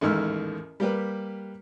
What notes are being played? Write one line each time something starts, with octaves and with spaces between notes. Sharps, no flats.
A1 D#2 G#2 E6 F6
G3 A#3 G4 B4